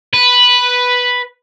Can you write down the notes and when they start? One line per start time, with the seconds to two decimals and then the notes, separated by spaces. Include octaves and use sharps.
0.13 B4